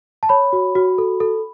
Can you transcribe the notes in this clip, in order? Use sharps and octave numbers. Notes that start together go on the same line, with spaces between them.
A5
C#5 B5
F#4
F#4
A4
A4